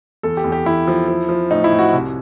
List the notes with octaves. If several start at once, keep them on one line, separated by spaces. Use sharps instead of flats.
E2 A4
G4
E2
G4
E2 E4
F3
F3
F3
A2 D#4
E4
A2
F#4
C2